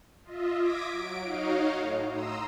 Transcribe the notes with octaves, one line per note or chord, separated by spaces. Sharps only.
F4 D#5 E5
D6 D#6 G#6 A#6 B6 D7
F#3 D7
D#4 F#4 C#5 D#5 F5
A2
A#5 C6 D#6 E6